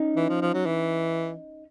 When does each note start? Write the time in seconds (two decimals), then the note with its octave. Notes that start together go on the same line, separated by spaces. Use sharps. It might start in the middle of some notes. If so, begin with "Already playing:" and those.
Already playing: C#4 D#4
0.16 E3
0.29 F3
0.41 F3
0.54 F#3
0.66 E3